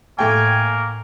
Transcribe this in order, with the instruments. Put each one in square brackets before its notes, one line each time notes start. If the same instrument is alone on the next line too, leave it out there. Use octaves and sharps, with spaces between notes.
[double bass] A2 [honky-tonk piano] A3 G5 [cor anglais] A#3 [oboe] G#5